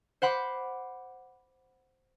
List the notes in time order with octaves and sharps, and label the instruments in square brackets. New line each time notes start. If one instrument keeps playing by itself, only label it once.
[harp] C5 F#5 B5 D6